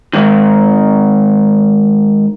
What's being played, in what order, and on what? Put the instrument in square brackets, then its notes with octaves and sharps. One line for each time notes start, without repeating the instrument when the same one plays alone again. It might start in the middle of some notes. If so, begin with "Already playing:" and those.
[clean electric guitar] G#2 D#3